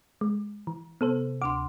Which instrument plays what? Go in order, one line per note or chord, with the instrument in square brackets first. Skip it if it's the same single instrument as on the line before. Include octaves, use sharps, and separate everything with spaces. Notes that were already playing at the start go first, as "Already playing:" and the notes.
[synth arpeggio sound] G#3
E3
[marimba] C3 [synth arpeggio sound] B3 A4 C5
[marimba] D2 D4 C6 [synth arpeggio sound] D6